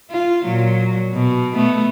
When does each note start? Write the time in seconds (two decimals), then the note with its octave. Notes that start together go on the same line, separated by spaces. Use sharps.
0.11 F4
0.44 A#2 F#3
1.13 B2
1.54 A3 B3